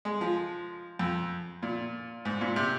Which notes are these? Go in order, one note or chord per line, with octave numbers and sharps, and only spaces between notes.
G#3
F3
F2
A#2
G#2
A#2
C3